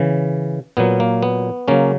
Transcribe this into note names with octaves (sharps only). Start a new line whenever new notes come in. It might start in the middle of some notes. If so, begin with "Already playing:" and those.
Already playing: C#3 E3
A#2 F#3 B3
A#3
B3
C#3 F#3 A#3 C#4